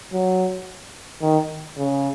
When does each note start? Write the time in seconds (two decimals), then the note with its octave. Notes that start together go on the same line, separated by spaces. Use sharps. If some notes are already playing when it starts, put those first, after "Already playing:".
0.13 F#3
1.22 D#3
1.77 C#3